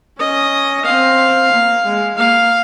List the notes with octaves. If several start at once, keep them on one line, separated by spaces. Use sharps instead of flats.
C#4 D#5
C4 F5
A#3
G#3
A#3 F5